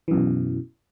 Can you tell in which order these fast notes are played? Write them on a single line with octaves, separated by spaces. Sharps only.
E3 F#2 B2